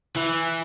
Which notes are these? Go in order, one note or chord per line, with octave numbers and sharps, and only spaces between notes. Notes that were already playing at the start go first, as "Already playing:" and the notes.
E3